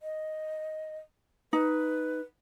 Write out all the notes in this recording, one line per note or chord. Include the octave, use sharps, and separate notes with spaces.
D#5
D#4 B4